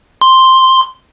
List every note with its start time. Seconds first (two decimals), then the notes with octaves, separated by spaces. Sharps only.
0.21 C6